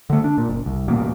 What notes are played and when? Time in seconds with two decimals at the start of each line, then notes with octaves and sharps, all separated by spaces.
0.10 D3 A3
0.24 D4
0.38 A#2
0.49 F#1
0.66 C2
0.88 D#1 A1 B2 A#3